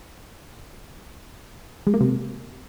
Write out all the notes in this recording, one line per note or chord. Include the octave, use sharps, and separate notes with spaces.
G#3
A#3
C3